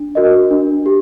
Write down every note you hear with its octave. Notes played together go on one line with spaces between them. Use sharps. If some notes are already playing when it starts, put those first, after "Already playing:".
Already playing: D4
F#4 A#4 D#5
D4
G4